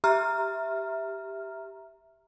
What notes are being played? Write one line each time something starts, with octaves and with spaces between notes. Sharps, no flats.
G4 E5 A#5 F6